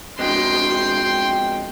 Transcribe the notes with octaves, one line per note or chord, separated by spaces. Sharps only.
F2 B2 G#3 G5 C6